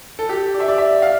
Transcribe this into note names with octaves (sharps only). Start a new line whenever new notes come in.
A4
G4
D5
E5
D5
E5
F5